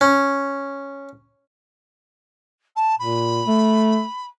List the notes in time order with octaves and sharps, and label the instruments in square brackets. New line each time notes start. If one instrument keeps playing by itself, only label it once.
[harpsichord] C#4
[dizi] A5
[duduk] A#2 [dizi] B5
[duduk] A3